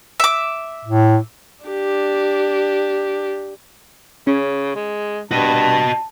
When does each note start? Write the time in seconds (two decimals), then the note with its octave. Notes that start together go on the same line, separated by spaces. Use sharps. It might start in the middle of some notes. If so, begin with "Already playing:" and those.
0.20 E5 D6
0.85 A2
1.65 D4 G4
4.27 C#3 C#4
4.75 G#3
5.31 G2 F#4 D#5 A5